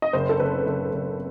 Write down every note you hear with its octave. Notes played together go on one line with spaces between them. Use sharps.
D#5
F#1 C5
A4
F#1 B4
F#1
F#1